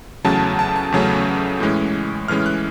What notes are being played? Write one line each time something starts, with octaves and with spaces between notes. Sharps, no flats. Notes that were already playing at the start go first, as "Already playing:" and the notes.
E2 C#3 F#3 A3 C#4 A5
A5
A5
E2 C#3 F#3 A3 C#4
A2 E3 G#3 C#4
A2 E3 G#3 C#4 F6
F#6